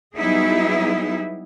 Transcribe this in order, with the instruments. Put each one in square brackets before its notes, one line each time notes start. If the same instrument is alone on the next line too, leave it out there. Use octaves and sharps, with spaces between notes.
[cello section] F#3 G3 B3 D#4 E4 G#4